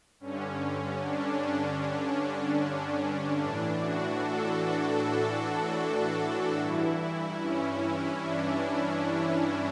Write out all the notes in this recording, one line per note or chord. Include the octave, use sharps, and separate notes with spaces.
G2 D3 C#4
D4
D4
A2 E3 D4
F#4
A4
A4
G2 E3 E4
E4
C#4
D4
D4
C#4